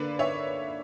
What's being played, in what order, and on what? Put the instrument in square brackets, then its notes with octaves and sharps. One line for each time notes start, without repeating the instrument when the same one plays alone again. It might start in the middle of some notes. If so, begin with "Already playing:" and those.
Already playing: [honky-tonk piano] D3 A#3 B4 D5
C#5 E5